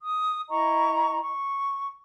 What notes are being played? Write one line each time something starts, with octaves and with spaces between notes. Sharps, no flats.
D#6
E4 D#5 A#5 C#6
C#6